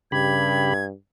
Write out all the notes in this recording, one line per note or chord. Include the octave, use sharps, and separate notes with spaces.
G2 C#3 G4 B5 G#6